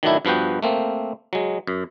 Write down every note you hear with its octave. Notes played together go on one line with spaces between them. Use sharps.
D#3 F#3 A3 D4 E4
G2 F3 B3 F#4 G5
A3 A#3 C4
F#3 G#3
F#2